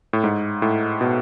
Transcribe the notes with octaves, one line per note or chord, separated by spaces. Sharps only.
A2
G#2
A2
B2